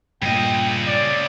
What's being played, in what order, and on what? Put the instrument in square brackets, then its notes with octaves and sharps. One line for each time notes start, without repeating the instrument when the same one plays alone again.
[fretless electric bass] G2 A#2 [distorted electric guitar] C#3 D#5 [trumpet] G5
[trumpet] D5